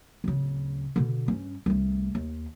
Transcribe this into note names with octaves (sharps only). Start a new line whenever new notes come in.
D1 C#3
B2 D3
G2 C#4
C2 A3
D#2